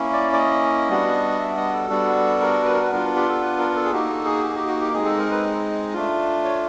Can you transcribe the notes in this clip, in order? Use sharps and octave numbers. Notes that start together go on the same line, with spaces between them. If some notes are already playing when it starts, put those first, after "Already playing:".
Already playing: A#3 C#4 E4
D5
D5
D#5
G3 B3 D4 F#4
E5
D#5
A4
G3 B3 D4 F#4
A#4
B4
A#4
B4
B3 D4 F4 A#4
G4
A4
B4
A#4
A#4
A4
G#4
A#3 D#4 F#4 G4
A4
G#4
G4
G#4
G4
F#4
G4
G#3 C4 D#4 G#4
A4
A#4
B4
A3 D4 F4
C#5